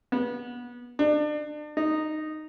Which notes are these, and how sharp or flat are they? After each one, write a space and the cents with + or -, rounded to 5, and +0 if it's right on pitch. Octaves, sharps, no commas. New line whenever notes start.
B3 -25
D4 +35
D#4 -10